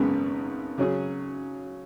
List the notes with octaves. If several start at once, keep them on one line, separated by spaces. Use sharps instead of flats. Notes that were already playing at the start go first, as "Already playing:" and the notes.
Already playing: G#1 F#2 C#3 G#3 B3
C#3 F#3 C#4 G#4